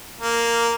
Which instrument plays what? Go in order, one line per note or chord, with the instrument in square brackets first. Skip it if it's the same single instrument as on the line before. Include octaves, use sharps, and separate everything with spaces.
[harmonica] A#3